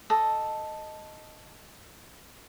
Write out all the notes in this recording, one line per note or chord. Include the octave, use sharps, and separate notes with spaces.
A4 D#5